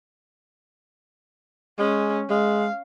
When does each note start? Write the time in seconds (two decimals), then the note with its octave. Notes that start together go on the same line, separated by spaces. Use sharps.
1.79 G#3 C#4
2.30 G#3 F5